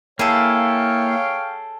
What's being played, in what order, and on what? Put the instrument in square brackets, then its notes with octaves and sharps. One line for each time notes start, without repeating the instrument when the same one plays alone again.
[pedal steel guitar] A#3 E4 [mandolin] G#4 A4 [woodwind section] C#5 F5 G5